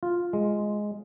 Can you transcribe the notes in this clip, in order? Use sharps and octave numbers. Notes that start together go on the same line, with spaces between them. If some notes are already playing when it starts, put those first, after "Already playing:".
F4
G#3